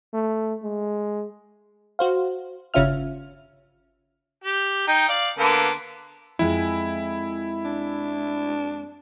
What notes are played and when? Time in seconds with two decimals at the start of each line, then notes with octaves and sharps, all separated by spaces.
0.14 A3
0.63 G#3
1.99 F#4 C5 F5
2.74 G1 C#3 C#4 F4 E5 F6
4.44 G4
4.87 D#4 G5
5.09 D5 F5
5.39 D3 A#3 B3
6.39 F2 G#3 E4 G#5
7.65 D4